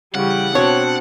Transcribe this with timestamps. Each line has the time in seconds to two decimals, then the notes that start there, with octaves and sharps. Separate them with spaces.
0.14 C#3 E3 G3 G4 F#5 C#6
0.55 B2 C4 D4 C#5 A5